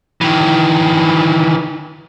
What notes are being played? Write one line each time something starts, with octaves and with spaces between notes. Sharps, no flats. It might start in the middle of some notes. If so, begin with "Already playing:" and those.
D#3 E3